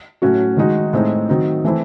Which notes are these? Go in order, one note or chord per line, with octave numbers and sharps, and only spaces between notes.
A2 F#3 C#4 F#4
D#3 G#3 D#4 F#4
A2 G#3 C4 D#4
D#3 F#3 C4 D#4
E3 A3 C4 E4